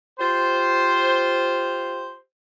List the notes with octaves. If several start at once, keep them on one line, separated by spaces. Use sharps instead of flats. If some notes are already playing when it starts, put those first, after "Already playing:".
F4 G4 C5